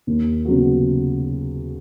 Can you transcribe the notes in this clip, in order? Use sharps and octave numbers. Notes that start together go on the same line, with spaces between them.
D#2
C#3 F#3 B3 F#4